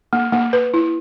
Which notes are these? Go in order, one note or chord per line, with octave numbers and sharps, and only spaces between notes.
A#3
A#3
B4
E4